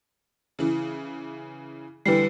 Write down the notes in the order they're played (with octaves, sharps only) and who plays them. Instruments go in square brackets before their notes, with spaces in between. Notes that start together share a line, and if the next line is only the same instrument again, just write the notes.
[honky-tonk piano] C#3 E3
[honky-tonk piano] D3 E3 G3 [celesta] B4 C7